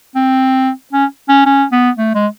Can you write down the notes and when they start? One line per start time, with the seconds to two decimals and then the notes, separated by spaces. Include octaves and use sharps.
0.15 C4
0.93 C#4
1.29 C#4
1.46 C#4
1.72 B3
1.98 A3
2.15 G#3